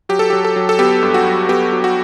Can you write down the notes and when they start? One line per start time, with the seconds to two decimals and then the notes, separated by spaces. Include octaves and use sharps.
0.09 F#3 G4
0.19 A4
0.30 F#3 G4
0.44 A4
0.56 F#3
0.69 A4
0.79 B3 G4
1.03 G2
1.14 F#4
1.25 F#3
1.49 B3 G4
1.72 F#3
1.84 F#4